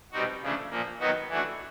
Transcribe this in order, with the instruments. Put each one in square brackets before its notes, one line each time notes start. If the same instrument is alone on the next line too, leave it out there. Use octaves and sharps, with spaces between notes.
[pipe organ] B2 G3 C4 D#4 F#4
C#3 F3 A3 D4
A#2 F3 A#3
D#3 F#3 B3 D#4 F#4
E3 A3 D4 F#4